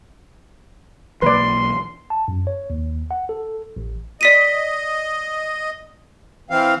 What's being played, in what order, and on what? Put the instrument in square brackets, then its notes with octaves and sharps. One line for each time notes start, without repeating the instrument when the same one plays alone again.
[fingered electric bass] B1 E3 A#3 [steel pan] B4 D5 [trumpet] C6
[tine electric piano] A5
F#2
C#5
D#2
F#5
A4
A1
[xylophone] D5 B6 D#7 [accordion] D#5
[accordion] E3 C4 F5